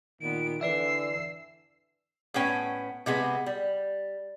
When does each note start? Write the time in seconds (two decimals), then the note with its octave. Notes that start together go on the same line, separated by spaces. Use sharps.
0.21 A#2 D#3 B3 D7
0.61 D3 E3 B4 D5 E5 E6 C7
2.34 A2 B3 C#4 G5
3.06 C3 G#3 B3
3.46 G3